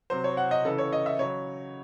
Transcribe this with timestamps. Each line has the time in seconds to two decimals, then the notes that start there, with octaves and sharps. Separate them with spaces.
0.10 C3 F#3 C5
0.24 C#5
0.37 F#5
0.51 D#5
0.65 C#3 E3 A4
0.78 C#5
0.93 D#5
1.06 E5
1.19 C#3 F#3 C#5